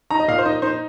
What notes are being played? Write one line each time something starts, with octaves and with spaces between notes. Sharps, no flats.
D#4 A#5
D#5
A#2 F5
C5
D#4 D#5
D#4 C5